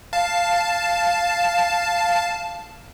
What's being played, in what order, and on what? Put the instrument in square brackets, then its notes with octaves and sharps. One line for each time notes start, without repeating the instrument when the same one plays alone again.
[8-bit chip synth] F5 A5